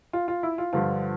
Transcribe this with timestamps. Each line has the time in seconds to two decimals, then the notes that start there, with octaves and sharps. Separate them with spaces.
0.13 F4
0.28 F4
0.43 E4
0.58 F4
0.73 G2 D3 F3 F4